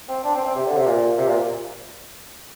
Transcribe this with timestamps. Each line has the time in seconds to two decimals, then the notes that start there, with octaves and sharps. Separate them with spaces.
0.09 C4
0.24 D4
0.35 C4
0.45 C4
0.55 C3
0.66 D3
0.77 C3
0.87 A#2
1.18 C3
1.28 A#2